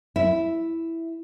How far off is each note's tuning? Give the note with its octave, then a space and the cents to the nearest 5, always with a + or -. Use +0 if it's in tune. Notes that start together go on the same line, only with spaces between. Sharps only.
E4 +0 E5 +0